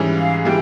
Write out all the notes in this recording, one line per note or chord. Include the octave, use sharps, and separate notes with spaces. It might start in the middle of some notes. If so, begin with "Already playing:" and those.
Already playing: G#2 E3 G3 C#4
F5
E3 G3 G5